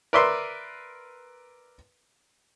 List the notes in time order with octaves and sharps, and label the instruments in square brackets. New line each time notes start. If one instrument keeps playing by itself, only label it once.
[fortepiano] A#4 B4 D5 E5 C6